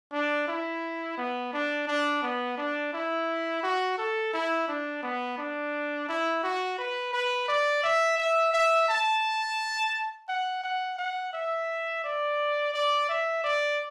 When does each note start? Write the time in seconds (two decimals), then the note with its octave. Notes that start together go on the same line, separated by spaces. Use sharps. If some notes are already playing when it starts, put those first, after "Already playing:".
0.12 D4
0.48 E4
1.17 B3
1.53 D4
1.88 D4
2.23 B3
2.58 D4
2.93 E4
3.63 F#4
3.98 A4
4.33 E4
4.68 D4
5.03 B3
5.38 D4
6.09 E4
6.43 F#4
6.78 B4
7.13 B4
7.48 D5
7.83 E5
8.18 E5
8.53 E5
8.89 A5
10.28 F#5
10.64 F#5
10.98 F#5
11.33 E5
12.04 D5
12.74 D5
13.09 E5
13.44 D5